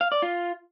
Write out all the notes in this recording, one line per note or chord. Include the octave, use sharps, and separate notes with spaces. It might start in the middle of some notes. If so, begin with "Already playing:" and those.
F5
D5
F4